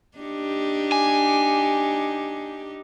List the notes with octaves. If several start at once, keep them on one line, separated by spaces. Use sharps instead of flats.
D4 D#4 G4
G#5